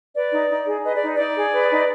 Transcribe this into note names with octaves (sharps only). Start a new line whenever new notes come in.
B4 D5
D#4
D#4
G#4
B4 D#5
D5
D#4
D#4 D5
G#4
B4
D#4